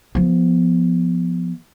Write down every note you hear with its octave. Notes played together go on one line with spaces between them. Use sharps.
F3 B3